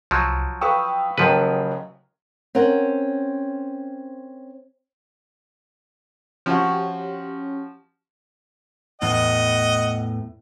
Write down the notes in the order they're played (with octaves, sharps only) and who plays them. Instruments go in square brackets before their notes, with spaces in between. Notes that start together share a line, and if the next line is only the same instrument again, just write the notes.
[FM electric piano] C2 [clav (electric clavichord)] F3 F#3
[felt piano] B4 F5 C#6 [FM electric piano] G5 D#6 E6
[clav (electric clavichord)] D#2 F3 B4 [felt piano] C#3 F#3
[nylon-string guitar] C4 C#4 A#4 F#5
[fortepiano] F3 F#4 [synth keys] C#4 G4
[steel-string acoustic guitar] E2 A2 [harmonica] D#5 F#5